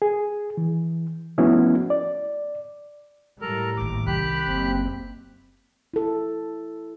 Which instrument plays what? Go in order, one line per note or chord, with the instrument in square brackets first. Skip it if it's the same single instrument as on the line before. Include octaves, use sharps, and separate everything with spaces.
[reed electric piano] G#4
E3
F3 A3 B3 C#4 E4 F#4
D5
[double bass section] A2 G3 [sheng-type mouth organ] A4 A#4 A#5
[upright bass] G#1 D#2 [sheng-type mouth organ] D6
[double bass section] C2 [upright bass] D#3 G3 [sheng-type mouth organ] G4 B5 F#6
[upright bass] F#1 [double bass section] C4
[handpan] E4 A4